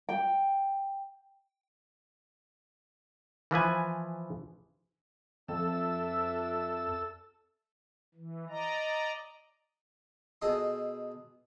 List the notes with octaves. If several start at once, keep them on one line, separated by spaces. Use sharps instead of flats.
G5
E3 F3 B4 G#5
F2 D4 A4 E5 E6
E3
D5 D#5 A#5
B2 G#4 A4 D#5 C6